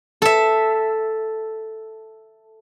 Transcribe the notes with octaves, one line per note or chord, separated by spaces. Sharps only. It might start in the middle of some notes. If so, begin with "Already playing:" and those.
A4 E5